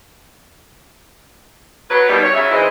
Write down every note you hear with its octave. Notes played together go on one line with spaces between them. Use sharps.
F#3 B4
B2 D#3 G3
C#5
C#3 F#3 C#4 E5
G#2 E3 G#3 C4 E4 D#5